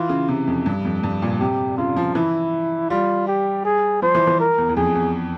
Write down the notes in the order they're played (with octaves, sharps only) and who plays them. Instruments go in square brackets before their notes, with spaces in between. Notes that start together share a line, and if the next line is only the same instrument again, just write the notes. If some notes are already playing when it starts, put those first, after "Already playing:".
Already playing: [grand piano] E3 [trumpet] F4
[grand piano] C#3
C3
F2
G2
F2
G2
A#2
[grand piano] C3 [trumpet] G4
[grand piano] C#3 [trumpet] F4
[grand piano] F3
[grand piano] E3 [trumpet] E4
[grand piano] G3 [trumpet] F4
[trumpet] G4
G#4
[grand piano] F3 [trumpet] C5
[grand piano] E3
E3
[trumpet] A#4
[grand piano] E2
E2
[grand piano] F2 [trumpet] G#4
[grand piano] E2